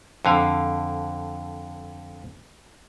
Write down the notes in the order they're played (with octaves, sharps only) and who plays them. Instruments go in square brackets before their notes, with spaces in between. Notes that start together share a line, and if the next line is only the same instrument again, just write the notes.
[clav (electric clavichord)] F2 D3 F5